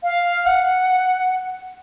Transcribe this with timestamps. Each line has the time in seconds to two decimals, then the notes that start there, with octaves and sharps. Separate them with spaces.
0.03 F5
0.46 F#5